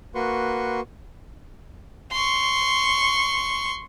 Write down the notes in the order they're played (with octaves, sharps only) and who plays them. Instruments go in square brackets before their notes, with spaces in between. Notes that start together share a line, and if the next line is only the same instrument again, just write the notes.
[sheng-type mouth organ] A#3 F#4 B4 C6 C#6
[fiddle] C6 C#6